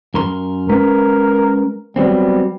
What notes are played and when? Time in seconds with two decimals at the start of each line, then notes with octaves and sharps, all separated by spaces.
0.14 F#2 A#4 C6
0.69 G#3 C#4 A#4 B4
1.96 F#3 G3 B3 C4